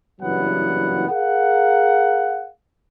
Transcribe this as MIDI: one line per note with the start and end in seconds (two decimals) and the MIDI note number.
0.21 1.06 30
0.21 1.06 43
0.21 1.06 52
0.21 1.06 54
0.21 1.06 59
0.21 1.06 78
1.08 2.48 68
1.08 2.48 70
1.08 2.48 77
1.08 2.48 78